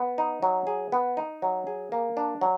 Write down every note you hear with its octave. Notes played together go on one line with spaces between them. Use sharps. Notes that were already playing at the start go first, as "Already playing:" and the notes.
Already playing: B3
D#4
F#3
G#4
B3
D#4
F#3
G#4
A#3
D4
F#3